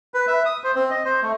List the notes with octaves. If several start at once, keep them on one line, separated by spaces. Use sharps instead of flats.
B4
E5
D#6
C5
C4
D#5
C5
A3